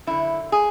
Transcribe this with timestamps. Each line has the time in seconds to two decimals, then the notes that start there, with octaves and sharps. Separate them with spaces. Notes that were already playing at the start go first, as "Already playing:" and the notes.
0.07 F#2 D3 E4
0.52 G#4